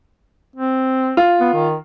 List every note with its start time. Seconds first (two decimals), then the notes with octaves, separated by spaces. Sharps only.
0.56 C4
1.17 F4
1.40 B3
1.53 D#3